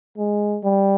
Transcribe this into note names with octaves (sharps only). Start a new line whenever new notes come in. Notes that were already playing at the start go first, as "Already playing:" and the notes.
G#3
G3